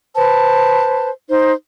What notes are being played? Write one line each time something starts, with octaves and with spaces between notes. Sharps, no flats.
B4 C5 A5
D#4 C5